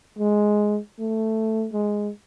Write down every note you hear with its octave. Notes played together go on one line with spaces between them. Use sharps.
G#3
A3
G#3